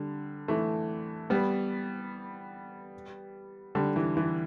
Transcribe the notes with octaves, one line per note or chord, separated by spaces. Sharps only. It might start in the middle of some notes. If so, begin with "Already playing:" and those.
Already playing: D3 G3
E3 A3
G3 B3
D3 G3
E3
E3